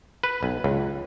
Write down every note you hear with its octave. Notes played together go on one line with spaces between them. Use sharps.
B4
B1
C#2